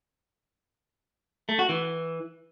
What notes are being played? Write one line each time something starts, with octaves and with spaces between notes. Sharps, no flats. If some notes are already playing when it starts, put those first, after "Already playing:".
A3
F#4
E3